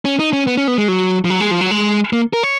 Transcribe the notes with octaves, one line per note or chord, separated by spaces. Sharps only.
C#4
D#4
C#4
B3
C#4
B3
G#3
F#3
F3
F#3
G#3
F3
F#3
G#3
A#3
A#4
C#5